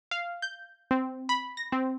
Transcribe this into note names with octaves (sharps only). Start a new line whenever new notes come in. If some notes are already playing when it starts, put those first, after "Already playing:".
F5
G6
C4
B5
A#6
C4